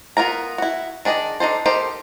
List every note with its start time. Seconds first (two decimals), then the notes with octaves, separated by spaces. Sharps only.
0.17 B3 F4 A#4 A#5
0.58 E4 F#4
1.05 D#3 D4 G#4 D#5
1.40 D4 D#4 A4 C5
1.66 D#4 G4 A4 A#4 C5